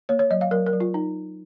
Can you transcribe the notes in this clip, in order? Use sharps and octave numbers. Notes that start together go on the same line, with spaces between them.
A#3 C#5
C#5
F#3 D#5
F5
F#3 A#4
A#4
F#3
F4
D#4